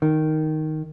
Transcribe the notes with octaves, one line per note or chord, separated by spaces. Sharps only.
D#3